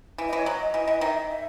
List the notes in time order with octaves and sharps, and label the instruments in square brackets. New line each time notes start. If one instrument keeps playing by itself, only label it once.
[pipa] E3 [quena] E5
[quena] D#5
[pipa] E3
[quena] C#5
[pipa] F#3 [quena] D#5
[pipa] E3
E3
[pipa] D#3 [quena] E5
[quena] D#5
E5